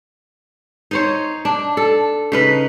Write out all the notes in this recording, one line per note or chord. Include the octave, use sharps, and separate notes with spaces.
D#4 C5 C#5
D4
A4
C#3 D#4 B4